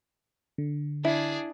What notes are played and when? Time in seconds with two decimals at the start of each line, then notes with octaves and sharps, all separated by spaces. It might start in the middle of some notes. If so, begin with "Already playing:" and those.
0.58 D3
1.05 D4 E4 G#4